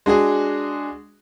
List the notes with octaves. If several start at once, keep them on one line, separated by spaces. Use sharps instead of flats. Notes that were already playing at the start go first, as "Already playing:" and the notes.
G#3 D4 F#4 G#4